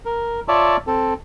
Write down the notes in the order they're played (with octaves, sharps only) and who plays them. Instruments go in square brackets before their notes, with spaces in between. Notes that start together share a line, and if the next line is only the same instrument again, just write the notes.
[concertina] A#4
F4 C#5 D5 E5 A5
C4 A4